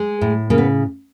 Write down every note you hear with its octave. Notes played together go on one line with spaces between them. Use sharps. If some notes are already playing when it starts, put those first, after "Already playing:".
Already playing: G#3
A2
C#3 A#3
B3